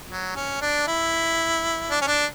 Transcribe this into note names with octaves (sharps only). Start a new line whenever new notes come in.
F#3
C#4
D4
E4
D4
C#4
D4